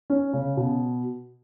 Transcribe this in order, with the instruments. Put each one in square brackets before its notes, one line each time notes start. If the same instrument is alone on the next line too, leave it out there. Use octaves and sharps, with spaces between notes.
[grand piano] C#4
C#3
B2